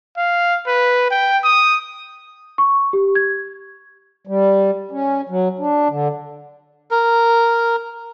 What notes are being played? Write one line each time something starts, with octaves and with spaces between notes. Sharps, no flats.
F5
B4
G5
D#6
C#6
G4
G#6
G3
C#4
F#3
D4
D3
A#4